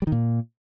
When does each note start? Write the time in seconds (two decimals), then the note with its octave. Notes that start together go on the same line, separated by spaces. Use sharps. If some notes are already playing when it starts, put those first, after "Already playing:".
0.02 G3
0.07 D#3
0.12 A#2